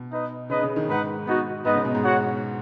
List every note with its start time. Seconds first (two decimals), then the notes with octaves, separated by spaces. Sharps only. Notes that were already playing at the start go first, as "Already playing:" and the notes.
Already playing: B2
0.12 D#4 B4 D#5
0.50 C#3 D#4 B4 D#5
0.63 C#3
0.76 D#3
0.88 G#2 D#4 B4 F#5
1.27 B3 D#4 F#4
1.65 G#2 B3 D#4 B4 D#5
1.75 C#3
1.85 B2
1.95 G#2
2.03 F#4 C#5 F#5